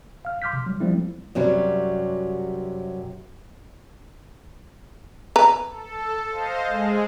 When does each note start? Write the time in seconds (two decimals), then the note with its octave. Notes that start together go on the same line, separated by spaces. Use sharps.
0.25 F5 F6
0.42 C6 D6 F6 G6 B6
0.53 C3
0.66 F#3 G3
0.80 F3 G3 A3 C4 E4
1.35 F#2 C3 F#3 G3
5.36 B4 A#5
5.69 A4
6.31 C5 D#5 F5
6.68 G#3 G#4